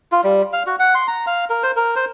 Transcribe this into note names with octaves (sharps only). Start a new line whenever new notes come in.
F4
G3
F5
F#4
F#5
C6
A#5
F5
A#4
C5
A#4
C5